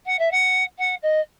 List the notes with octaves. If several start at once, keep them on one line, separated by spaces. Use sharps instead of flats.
F#5
E5
F#5
F#5
D#5